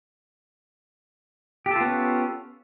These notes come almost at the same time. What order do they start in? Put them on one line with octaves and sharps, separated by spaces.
G4 A4 F4 B3 C#4